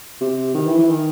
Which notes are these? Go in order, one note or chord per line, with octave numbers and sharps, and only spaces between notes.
C3
D#3
E3
E3
D#3